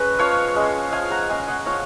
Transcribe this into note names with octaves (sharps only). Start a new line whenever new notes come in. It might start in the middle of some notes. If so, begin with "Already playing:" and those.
Already playing: G#3 C#4 B4 D#5
F3 C#5 F5
G#3 C#4
F3 F5 G#5
F#5 A#5
G#3 C#4 F5 G#5
D#5 F#5
F3 C#5 F5